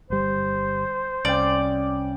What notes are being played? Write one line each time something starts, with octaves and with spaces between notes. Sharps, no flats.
G1 G3 C5
C2 C#3 D5 G5